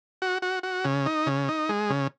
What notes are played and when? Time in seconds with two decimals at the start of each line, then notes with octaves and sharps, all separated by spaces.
0.22 F#4
0.42 F#4
0.63 F#4
0.85 C#3
1.06 D#4
1.26 C#3
1.49 D#4
1.69 G#3
1.90 C#3